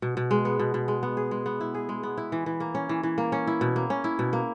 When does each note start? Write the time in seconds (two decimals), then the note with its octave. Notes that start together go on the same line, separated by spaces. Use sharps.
0.02 B2
0.17 B2
0.31 G#3
0.45 B3
0.59 B2
0.74 B2
0.88 G#3
1.03 B3
1.17 G#4
1.31 G#3
1.46 B3
1.61 E4
1.74 G#4
1.89 G#3
2.03 B3
2.18 E4
2.32 E3
2.46 E3
2.60 A#3
2.75 C#4
2.89 E3
3.03 E3
3.18 A#3
3.32 C#4
3.47 E4
3.61 B2
3.76 A#3
3.90 C#4
4.04 E4
4.19 B2
4.33 A#3